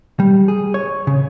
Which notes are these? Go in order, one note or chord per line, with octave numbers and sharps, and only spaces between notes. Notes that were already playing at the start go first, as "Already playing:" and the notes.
G3
G#4
C#5
C#3